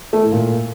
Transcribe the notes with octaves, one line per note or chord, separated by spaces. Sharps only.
A3
A2
A#2